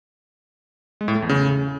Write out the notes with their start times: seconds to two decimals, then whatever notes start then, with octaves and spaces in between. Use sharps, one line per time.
1.01 G#3
1.08 A2
1.15 A3
1.22 E2
1.29 C#3